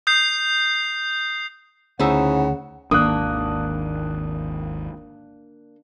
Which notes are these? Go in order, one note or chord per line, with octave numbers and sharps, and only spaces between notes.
D#6 G6 C7
D2 C#3 D#4 E4 C5 F#5
G#1 D#2 A#3 D4 A#4 D#6 F#6